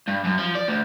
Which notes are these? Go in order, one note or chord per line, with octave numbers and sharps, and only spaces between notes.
G2
F#2
F3
D5
D2